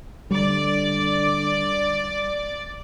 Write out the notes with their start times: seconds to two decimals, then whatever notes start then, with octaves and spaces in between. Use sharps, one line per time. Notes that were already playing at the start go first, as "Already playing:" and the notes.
0.31 D3 G3 D5